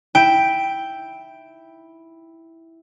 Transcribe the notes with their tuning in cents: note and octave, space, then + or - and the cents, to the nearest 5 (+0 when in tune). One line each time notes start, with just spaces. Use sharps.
E4 -5 G5 +0